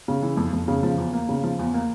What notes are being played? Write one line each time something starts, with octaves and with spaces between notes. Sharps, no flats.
C#3
E3
F2
F2
C#3
F3
E2
A#3
C#3
F3
E2
A#3